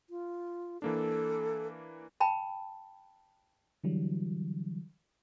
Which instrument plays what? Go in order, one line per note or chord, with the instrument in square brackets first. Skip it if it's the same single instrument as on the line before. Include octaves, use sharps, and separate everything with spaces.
[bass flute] F4
[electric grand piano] E3 A#3 D4 [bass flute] A4
[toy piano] G5 A5 B5
[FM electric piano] D3 E3 F#3 G3